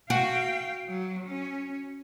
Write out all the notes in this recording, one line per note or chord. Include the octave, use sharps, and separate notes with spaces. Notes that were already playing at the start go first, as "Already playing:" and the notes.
F#4 F5 G5
F#3
C#4